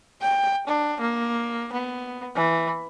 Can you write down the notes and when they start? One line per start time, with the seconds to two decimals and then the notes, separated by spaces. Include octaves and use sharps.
0.21 G5
0.67 D4
1.00 A#3
1.73 B3
2.36 E3